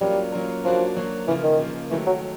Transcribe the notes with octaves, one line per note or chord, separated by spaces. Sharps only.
F#3 G3 A#3 C#4 F4 A#4
F#3 A#3 C#4 F4 A#4
F3 F#3 A#3 D4 F#4
F#3 A#3 D4 F#4
C#3 E3 F3 A#3
D#3
C#3 F3 A#3
D#3 E3 F#3 A3
F#3